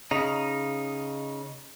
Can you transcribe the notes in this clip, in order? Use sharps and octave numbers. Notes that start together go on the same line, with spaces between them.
C#3 D#4